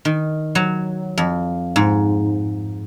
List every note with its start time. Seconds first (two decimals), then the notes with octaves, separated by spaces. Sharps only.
0.05 D#3
0.55 F#3
1.18 F2
1.76 G#2